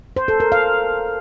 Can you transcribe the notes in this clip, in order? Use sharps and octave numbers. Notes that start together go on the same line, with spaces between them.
C5
A4
A#4
F5